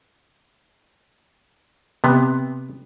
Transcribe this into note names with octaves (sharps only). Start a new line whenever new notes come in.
C3 B3